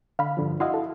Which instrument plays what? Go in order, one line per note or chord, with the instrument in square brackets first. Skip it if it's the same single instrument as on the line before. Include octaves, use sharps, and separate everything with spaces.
[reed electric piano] D3 [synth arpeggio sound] F5 B5
[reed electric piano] G2 D3 F3
[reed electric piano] E4 F#4 F5 [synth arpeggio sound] D#5 F#5 C6
[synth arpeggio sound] A4